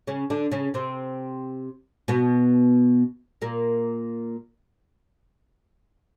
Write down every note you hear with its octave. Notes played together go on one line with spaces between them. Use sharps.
C#3 C#4
D3 D4
C#3 C#4
C3 C4
B2 B3
A#2 A#3